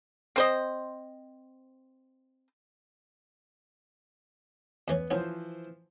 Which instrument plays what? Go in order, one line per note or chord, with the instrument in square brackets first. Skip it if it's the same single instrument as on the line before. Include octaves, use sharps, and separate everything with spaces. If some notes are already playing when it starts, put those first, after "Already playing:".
[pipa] C4 C5 D#5
[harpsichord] E2 E3 C#4 [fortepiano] B3
[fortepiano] E3 F3 C5 [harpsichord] B3 C#4